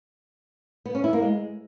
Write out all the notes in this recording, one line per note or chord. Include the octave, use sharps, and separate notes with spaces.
B3
C#4
E4
A#3
G#3